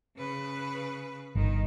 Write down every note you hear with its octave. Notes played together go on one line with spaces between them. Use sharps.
C#3 B4
G1 D#3 D#4